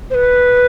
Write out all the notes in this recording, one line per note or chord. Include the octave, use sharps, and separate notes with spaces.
C5
B4